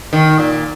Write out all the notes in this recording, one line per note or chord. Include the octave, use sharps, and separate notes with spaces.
D#3
A#2